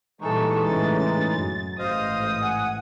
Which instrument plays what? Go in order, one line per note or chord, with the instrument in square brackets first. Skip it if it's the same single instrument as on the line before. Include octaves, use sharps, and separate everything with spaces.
[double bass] A#2 [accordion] E3 G#3 D#4 [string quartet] G3 A4 C#6
[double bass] A2 C#3 [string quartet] A6
[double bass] F#2
[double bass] A1 G#2 [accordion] C5 D#5 F5 [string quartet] D#6
[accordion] F#5 G#5